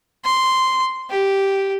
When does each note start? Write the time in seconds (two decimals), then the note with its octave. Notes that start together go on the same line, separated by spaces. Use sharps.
0.25 C6
1.10 G4